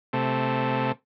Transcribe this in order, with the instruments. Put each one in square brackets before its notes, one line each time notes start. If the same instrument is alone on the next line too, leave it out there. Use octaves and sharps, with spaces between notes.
[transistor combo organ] C3 A3